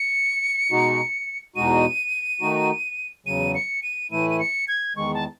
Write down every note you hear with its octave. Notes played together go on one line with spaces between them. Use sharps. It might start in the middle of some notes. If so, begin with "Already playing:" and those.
Already playing: C#7
B2 G#3 D#4 F#4
E2 B2 G#3 D#4 F#4 D#7
D#3 A3 D#4 F#4
E2 C#3 F#3 D#7
C#7
D#7
A2 E3 A3 E4 D#7
D#7
C#7
G#6
E2 D#3 G#3 C#6
A5